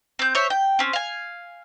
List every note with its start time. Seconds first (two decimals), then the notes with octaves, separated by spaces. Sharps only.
0.19 C4 G6
0.35 C5 C#5 E5
0.50 G5
0.79 C4 C#4
0.93 F5 G#5